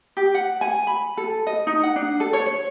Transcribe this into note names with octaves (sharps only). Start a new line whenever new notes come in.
G4
F#5
G#5
B5
A4
D#5
D#4
F#5
D4
A4
C#5
C#5